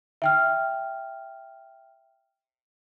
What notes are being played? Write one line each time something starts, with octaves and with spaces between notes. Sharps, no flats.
E5 G5 F6